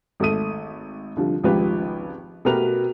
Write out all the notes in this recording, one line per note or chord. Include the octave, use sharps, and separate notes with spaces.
G#1 A3 A4 D#6 D#7
C2 D3 F3
G#1 C#2 F3 D#4 G4 B4
B2 A3 G4 A#4 B4 F7